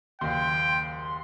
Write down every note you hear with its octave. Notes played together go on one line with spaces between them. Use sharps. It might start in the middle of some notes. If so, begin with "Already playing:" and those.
F#1 D#2 G5 C6